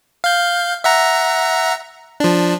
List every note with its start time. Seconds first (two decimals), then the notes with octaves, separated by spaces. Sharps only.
0.24 F5 G6
0.84 E5 F#5 A#5
2.20 F3 D4